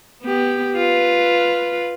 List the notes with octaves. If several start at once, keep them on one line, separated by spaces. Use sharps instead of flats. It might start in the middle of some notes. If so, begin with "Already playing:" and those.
B3 G4
F4 B4